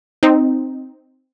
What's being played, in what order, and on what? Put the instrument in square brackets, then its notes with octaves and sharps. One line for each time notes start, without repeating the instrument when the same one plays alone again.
[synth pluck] C4 D#4